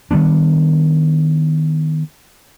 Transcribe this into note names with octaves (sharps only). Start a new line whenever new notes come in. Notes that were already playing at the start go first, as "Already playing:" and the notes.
D#3 G3 B3 D4